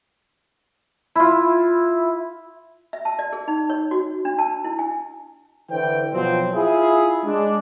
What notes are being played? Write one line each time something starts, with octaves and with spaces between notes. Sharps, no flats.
E4 F4
E5
A5
D5
G#4
D#4
C#5
F#4
D4
A5
E4
G#5
D3 E3 C5 G5
B2 F3 F#3 C4
E4 F4 G#4
G#3 D4